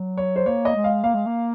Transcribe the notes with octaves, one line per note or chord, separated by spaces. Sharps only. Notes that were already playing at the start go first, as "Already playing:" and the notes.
Already playing: F#3
C#5
C5
A#3 C#5
D#5
G#3
F5
A#3 F5
G#3
A#3